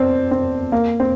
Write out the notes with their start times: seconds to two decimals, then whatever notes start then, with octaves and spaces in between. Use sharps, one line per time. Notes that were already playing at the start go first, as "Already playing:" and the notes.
Already playing: C4 D4
0.31 C4
0.72 A#3
1.00 C4